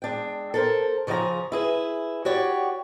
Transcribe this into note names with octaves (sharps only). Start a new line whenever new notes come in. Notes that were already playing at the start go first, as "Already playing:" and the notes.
G#3 D4 G5
A4 A#4 C5
C#3 F3 G#4 E5 A#5
E4 G#4 B4
F#4 G4 C#5 D5